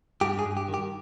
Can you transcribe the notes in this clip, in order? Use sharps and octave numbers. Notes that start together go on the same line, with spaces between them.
G2 G4
G#4
G2
G4
D#3
G4